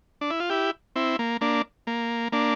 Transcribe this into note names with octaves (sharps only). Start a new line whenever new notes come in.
D4
E4
F4
E4 G4
C4 E4
A#3
A#3 D4
A#3
A#3 D4